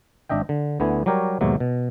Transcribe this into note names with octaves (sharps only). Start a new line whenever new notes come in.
G#1 D4 D#5 E5 G5
D3
D2 D3 B3 E4 G#5
F#3 G3 G4 A#4 C#5
D#2 G#2 B2 F#3 E5
B2